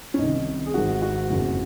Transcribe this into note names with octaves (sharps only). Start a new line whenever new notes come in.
C#4
C2 C3 D#3 D#4
G#4
G#1 G#2 D#3 F#4
F#4
F#1 F2 C#3